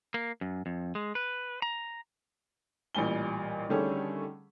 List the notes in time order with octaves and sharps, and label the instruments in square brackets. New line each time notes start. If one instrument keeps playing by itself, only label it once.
[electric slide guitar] A#3
F#2
F2
G#3
B4
A#5
[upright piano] A1 A#2 G3 G#5 G7
D3 D#3 G3 A3 C#4 G#4